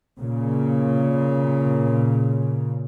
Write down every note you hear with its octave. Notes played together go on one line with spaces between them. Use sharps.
A#2 C#3